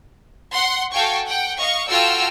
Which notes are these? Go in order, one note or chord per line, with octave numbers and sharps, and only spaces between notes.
F#5 C6
F#4 A4 F5 G5 G#5 C#6
F#5 G5
D#5 F5 C#6
F4 F#4 A4 G5 E6 F6